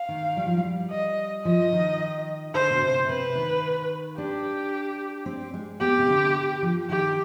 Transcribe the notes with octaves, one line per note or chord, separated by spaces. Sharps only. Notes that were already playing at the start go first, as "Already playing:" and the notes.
Already playing: F5
D#3
G3
F3
G3
D#5
F3 D#5
D#3
D3 C5
B2
C3
C3 B4
D#3
D4 G4
C4
G#3
B3 G4
C3
D3
F3
D#3 G4